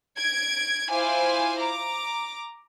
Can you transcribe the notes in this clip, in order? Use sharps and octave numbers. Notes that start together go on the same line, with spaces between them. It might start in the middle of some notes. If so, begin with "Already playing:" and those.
G#6 D7
E4 F4 C5 F5 G#5 D6
A#5 D6